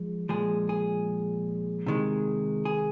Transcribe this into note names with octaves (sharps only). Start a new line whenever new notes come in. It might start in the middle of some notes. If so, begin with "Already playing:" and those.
Already playing: F3 G#3
A#2 F3 G#3 G#4
G#4
C3 D#3 G#3
G#4